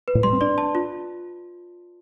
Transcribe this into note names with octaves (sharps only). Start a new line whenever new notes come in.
B4
A2
G3 C6
C4
D4 D5
A5
F4